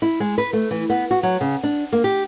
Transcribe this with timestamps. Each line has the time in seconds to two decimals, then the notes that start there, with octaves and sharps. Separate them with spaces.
0.02 E4
0.20 G#3
0.38 B4
0.53 A3
0.71 E3
0.90 B3
1.11 F#4
1.23 F#3
1.41 C#3
1.63 D4
1.92 A#3
2.04 G4